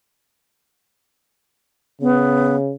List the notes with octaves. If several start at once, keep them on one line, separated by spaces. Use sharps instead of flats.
C#3 B3